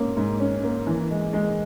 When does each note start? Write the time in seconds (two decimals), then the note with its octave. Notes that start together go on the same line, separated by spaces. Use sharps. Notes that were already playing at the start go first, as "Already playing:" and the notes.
Already playing: G#2 A#3 C#4
0.17 G#2
0.40 C#4
0.64 A#3
0.87 E3
1.11 G#3
1.33 G#3